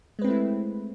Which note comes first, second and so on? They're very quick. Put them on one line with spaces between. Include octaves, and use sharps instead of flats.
G#3 B4 C4 A3 E4